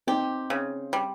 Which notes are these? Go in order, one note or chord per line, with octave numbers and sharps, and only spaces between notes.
C4 D#4 G4
C#3
G3